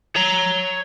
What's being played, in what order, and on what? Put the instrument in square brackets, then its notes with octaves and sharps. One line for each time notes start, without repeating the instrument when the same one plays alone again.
[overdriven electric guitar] C#5 A#5